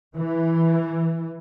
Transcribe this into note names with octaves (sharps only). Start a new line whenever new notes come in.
E3